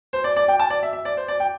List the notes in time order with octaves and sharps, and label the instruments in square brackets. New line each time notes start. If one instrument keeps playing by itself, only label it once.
[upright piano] C5
D5
D5
G5
A5
D5
E5
E5
D5
C5
D5
G5